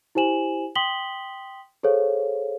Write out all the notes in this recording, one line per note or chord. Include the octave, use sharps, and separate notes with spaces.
E4 G4 C5 G#5 E7 F#7
G5 C6 D#6 B6 F#7 G7
G#4 A4 C5 C#5 F5